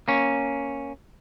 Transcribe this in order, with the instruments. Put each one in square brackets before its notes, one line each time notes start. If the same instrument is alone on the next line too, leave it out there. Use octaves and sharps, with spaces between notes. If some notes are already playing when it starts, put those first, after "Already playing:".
[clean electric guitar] A#3 C#4